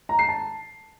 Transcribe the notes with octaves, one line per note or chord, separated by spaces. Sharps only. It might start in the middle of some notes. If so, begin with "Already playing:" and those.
A#5
C7
A5